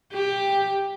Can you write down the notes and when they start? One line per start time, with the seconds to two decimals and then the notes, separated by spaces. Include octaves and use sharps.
0.14 G4